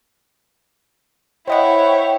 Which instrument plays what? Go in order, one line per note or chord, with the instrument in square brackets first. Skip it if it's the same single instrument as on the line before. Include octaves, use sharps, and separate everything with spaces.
[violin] E4 C#5 [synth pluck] C5 D#5 F#5 [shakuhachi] G5